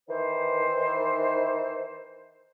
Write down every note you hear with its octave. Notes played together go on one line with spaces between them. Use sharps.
D#3 E3 C5